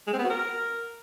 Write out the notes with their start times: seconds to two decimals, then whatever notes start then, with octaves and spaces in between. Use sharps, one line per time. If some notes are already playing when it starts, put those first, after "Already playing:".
0.07 G#3
0.13 C4
0.19 B3
0.24 F#4
0.30 A#4